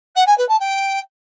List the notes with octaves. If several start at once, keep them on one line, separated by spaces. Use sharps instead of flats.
F#5
G#5
B4
A5
G5